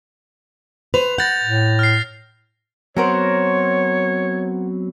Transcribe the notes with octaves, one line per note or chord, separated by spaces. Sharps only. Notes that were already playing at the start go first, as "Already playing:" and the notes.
B4 C5 F7
F#5 G6 A6 A#6
A2
F6 C7
F#3 B3 C4 F#4 A#4 C5 C#5